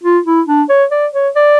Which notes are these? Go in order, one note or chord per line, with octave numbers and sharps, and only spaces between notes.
F4
E4
D4
C#5
D5
C#5
D5